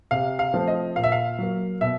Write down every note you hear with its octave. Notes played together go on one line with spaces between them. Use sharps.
C3 F5
F5
F3 A3 C4
D#5
A#2 F5
E5
F5
F#3 A#3
B2 E5